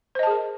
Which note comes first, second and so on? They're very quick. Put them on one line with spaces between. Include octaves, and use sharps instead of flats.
C5 D#5 A5 G#4 A#4